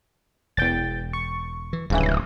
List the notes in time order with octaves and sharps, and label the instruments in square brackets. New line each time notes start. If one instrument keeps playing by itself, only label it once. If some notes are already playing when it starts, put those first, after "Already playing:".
[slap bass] E1 [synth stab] E2 G5 A6
[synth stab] C#6
[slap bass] E3
[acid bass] D1 [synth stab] A1 C#3 E3 [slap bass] G2